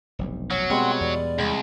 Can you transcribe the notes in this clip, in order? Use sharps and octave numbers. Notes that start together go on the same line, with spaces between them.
F1 B1 G2
F#3 C#4
B2 G3 G#3 C4 F#5 G5 C6
E2 D5
C2 G#3 B5